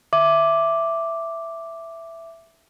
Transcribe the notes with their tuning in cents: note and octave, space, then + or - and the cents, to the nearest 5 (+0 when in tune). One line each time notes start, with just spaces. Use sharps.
E5 +5 D6 +0